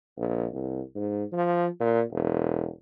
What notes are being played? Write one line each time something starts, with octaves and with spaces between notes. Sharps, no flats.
A#1
C2
G#2
F3
A#2
E1